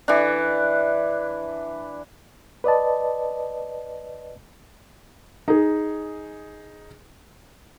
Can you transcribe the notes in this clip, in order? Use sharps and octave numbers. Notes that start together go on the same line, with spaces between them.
E3 D4
B4 D5 D#5 A5
D#4 G#4